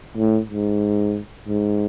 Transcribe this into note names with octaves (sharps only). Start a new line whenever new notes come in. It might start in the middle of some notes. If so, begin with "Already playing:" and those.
A2
G#2
G#2